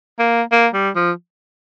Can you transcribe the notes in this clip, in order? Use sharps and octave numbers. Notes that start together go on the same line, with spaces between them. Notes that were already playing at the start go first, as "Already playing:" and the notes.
A#3
A#3
G3
F3